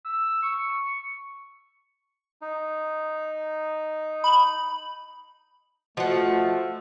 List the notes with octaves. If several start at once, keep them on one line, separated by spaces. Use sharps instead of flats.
E6
C#6
D#4
B5
B2 F3 A3 F#5